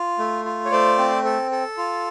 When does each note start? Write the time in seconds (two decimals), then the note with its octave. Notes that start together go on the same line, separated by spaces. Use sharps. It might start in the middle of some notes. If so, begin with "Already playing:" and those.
Already playing: F4
0.19 A3
0.45 F4
0.65 C#5
0.71 A3 C5 D5
0.98 C4
1.25 A4
1.51 A4
1.78 F4